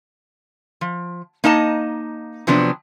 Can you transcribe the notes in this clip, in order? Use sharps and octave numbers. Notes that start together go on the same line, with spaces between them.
F3
A#3 D#4 D#5 A5
C3 F3 F#3 B3 D4